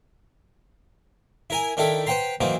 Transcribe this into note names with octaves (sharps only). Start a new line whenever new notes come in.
E4 A#4 G#5
D#3 D4 E4 A4 G5 B5
B4 C5 F#5 G5 A#5 C6
E3 F#3 A#3 C4 D#4